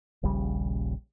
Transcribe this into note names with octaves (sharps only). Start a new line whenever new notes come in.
D#1 A#1 C#3 G3